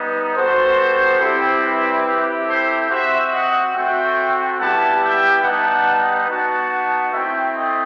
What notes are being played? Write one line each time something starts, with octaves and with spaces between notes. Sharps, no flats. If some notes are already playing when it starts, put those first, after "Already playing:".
Already playing: G3 B3 D#4
G3 B3 F#4 A4 C5
G3 C4 E4 G4
G4 B4
C4 E4 G4
A4 C5
C4 F#4 C5 E5
D#5 F#5
A3 C4 F#4 E5 G5
G3 B3 E4 G4 F#5 A5
E5 G5
G3 B3 D#4 F#5 A5
B3 D#4 F#4 F#5 A5
A3 C4 E4 E5 G5
D#5